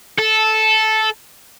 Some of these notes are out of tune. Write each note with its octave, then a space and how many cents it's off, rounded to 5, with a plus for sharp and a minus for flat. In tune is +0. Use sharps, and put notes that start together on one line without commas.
A4 -10